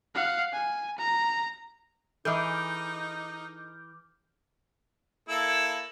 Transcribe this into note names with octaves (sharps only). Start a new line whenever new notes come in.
F5 F#5
G#5
A#5
E3 D#4 G#4 A4 D#5 D6 F6 G6
A#3 E4 A4